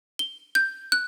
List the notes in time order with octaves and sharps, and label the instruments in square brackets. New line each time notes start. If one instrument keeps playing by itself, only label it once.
[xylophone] G7
G6
F#6